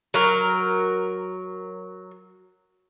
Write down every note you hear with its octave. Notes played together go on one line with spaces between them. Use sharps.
F#3 A#4